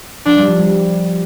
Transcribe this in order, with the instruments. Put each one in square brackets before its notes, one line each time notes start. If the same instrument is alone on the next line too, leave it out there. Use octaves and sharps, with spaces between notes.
[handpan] F3 [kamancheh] D4
[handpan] G3
F3
G3